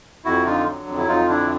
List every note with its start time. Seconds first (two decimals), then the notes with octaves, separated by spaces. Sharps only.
0.25 F2 E4 F#4
0.45 D3 D#4 F4
0.67 F#3
0.87 F2
0.98 E4
1.08 F2 D#4 F4
1.29 D3 D4 E4